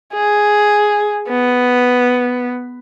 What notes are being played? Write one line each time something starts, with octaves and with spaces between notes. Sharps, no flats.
G#4
B3